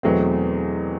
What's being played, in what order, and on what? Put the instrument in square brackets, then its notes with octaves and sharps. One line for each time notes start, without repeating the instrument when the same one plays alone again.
[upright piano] E2 B2 F#3 A3 C4